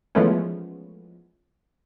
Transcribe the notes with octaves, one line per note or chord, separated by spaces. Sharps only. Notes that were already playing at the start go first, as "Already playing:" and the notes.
E3 F3 G#3 A3 B3 C#4